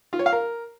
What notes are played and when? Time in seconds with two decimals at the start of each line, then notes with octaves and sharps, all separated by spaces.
0.13 F4
0.19 C#5
0.26 F5
0.33 A#4